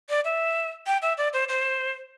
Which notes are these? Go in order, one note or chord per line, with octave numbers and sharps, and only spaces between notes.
D5
E5
G5
E5
D5
C5
C5